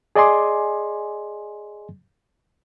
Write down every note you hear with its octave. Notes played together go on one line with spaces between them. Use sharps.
G#4 D5 D#5 G#5 C6 D6